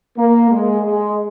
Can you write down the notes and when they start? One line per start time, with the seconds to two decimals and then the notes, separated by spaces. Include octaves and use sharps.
0.18 A#3
0.51 G#3
0.84 G#3